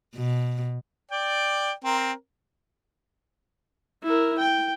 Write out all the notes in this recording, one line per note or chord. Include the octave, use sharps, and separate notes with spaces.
B2
D5 G5
C4 A#4
E4 A#4
G5